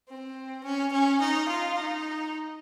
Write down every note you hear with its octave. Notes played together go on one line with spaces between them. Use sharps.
C4
C#4
C#4
D#4
F4
D#4